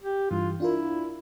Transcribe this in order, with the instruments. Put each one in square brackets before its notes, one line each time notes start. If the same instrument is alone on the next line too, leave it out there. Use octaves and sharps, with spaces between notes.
[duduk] G4
[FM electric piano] G2 E3 [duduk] F4
[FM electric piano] D4 F4 A#4 [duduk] E4